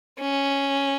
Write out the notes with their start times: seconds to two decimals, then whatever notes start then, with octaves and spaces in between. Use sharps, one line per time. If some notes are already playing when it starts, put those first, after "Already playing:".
0.20 C#4